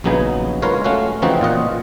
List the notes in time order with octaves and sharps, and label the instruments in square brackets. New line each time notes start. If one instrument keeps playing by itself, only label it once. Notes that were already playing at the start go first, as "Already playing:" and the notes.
[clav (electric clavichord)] A#1 C#3 F#3 B3 D#4 G#5
G#3 F4 A#4 B4 C#5 F5
A3 C#4 F#4 F5
C#3 E3 F3 C4 D#4 F#4
A#2 F4 D#5 F#5